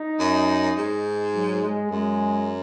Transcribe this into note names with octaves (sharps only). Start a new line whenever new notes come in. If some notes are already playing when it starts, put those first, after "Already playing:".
Already playing: D#4
F#2
G#2
F#3
G#3
F#2 G#3